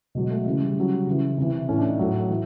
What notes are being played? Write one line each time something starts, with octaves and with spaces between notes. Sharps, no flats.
B2 F#3 G#3
A3
C#3 E3
G3
C#3 F#3
C#3 E3
C3 E3
A2 E3 C#4
D4
D#4
A2 F#3 E4
E3